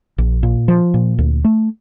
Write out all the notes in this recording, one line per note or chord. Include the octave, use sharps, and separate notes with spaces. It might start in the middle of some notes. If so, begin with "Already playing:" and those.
A#1
A#2
F3
A#2
D2
A3